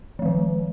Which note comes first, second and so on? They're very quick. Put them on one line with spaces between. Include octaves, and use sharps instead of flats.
F3 G#3 D#3